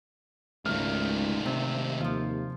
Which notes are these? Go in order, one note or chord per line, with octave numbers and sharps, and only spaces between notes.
G#1 C#2 D#3 A3 F6
C3
D#2 F3 F4